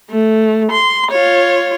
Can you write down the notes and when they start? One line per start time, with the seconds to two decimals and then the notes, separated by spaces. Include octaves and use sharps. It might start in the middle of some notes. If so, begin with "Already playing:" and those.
0.10 A3
0.72 C6
1.11 F4 C#5